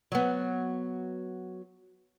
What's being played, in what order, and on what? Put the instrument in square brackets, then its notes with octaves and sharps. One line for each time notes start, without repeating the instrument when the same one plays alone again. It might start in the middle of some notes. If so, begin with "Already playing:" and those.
[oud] F#3 B3